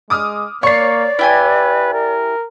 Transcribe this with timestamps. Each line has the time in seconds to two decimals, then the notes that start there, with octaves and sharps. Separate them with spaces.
0.10 G#3 D6 D#6 F6
0.63 A#3 C#5 D5 C#6 C7
1.19 E4 G4 B4 G#5
1.93 A#4